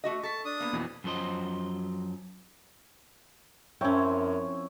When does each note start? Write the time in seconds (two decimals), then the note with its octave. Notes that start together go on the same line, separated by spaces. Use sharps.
0.04 A3 F#4 D#5
0.24 A4 A5 C#6 B6
0.45 D4 D#6
0.60 A#3 B3
0.73 F2 B2 E3
1.04 F#2 F3 F#3 C5 D#5
3.81 F#2 F3 C4 C#4 E4 C#5